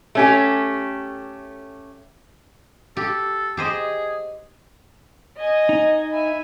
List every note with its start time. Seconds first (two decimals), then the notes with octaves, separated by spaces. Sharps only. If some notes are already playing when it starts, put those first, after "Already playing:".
0.15 A3 C#4 G4
2.97 G4 A4
3.57 G4 G#4 C5 D#5
5.37 D#5 G#5
5.69 D#4
6.11 E5 G#5 B5